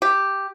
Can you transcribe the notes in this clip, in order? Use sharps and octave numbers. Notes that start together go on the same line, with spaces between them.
G4